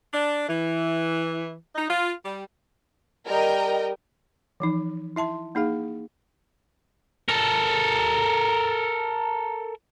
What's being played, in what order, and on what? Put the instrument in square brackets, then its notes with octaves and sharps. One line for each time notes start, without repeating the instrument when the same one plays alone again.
[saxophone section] D4
E3
D#4
F4
G3
[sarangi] G3 [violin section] A#4 D#5 G5
[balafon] E3 F3 D#4
E4 E5 A5 C6
A#3 D#4 G#4 F5
[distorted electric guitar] A4 A#4